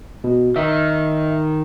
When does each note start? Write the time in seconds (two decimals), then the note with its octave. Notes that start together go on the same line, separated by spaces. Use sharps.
0.24 B2
0.56 D#3 D#5 E5